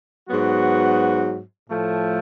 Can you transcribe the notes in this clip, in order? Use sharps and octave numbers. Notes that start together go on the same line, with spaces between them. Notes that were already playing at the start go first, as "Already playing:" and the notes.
G#2 F#3 B3 F#4
A2 F3 A3